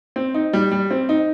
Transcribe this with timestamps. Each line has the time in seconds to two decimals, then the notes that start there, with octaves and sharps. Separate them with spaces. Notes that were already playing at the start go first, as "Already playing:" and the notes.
0.16 C4
0.34 D#4
0.53 G3
0.72 G3
0.91 C4
1.09 D#4